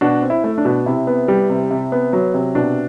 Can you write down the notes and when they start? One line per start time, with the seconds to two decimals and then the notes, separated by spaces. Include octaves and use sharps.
0.01 B2 D4 F#4
0.22 C4
0.30 E4
0.44 A3
0.58 D4
0.65 B2
0.86 C3 E4
1.07 B3
1.28 G3
1.49 C3
1.71 C3
1.92 B3
2.13 F#3
2.34 C3
2.55 B2 D4